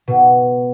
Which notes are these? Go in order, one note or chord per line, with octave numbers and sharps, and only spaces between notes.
B2